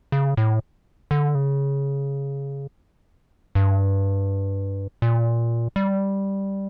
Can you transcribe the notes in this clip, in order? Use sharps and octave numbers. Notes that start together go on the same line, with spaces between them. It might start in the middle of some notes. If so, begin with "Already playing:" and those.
C#3
A2
D3
C#3
G2
A#2
G3